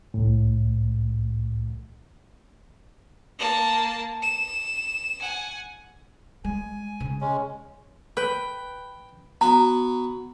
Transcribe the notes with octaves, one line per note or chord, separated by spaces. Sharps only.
C2 A2
A#3 A5
E7
F#5 G#5
G#3 G#5
C#3
G#3 C#4
B4 G5
B3 F#4 A#5